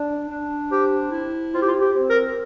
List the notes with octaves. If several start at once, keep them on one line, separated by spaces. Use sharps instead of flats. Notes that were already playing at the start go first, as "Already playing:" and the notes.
Already playing: D4
D4
C4 G4
E4
C4 F4
G4
F4
G4
C4
A#4